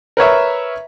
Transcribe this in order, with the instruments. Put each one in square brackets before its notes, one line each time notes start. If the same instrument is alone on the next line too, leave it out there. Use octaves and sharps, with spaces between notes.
[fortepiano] A#4 B4 C#5 E5